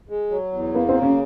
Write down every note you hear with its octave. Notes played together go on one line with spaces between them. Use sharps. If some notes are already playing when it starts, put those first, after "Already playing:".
G#3
F#3
E2
A#3 B3
C4
C#3
C#4